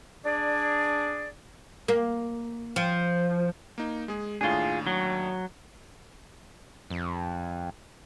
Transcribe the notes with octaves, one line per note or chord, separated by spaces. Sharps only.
D4 G#4 D5
A#3
F3
A#3 D#4
G#3 G#4
D#2 A2 D4 F4 G#4
F#3
F2